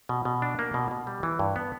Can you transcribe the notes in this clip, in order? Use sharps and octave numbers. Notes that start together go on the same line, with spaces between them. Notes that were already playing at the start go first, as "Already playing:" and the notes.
B2
B2
D4
A#3
B2
B2
G3
E3
G2
B3